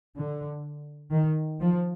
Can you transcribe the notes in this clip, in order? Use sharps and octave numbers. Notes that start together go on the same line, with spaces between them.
D3
D#3
F3